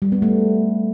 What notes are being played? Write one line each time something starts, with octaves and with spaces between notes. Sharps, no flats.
G3
B3
A3